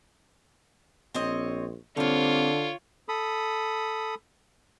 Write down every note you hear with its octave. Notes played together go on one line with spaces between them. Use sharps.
A#1 C4 C#5 D#5
D3 G3 A#3 C4 F4 C#5
A4 B5 D#6